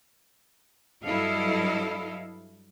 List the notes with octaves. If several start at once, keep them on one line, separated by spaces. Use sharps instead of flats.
G2 F#3 E4 A4 D#5 F5